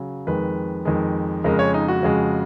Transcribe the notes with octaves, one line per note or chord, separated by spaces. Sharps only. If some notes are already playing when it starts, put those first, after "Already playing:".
Already playing: C#3 F#3
F2 D#3 G#3 B4
F2 D#3 G#3
F2 C#3 G#3 A#4
C#5
D#4
F#4
F2 C#3 G#3